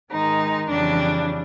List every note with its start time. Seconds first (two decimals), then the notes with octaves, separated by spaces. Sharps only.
0.12 G#2 D#3 G#3 D#4
0.69 F2 C#3 E3 G3 D4